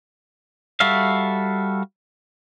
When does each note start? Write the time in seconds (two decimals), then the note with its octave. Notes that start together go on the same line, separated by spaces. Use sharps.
0.80 G3 F#4 A4 E5 F5